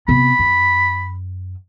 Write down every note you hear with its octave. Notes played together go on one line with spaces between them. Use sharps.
C3 B3 B5
F#2